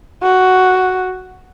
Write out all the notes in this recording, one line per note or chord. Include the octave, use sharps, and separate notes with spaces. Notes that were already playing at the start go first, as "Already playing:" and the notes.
F#4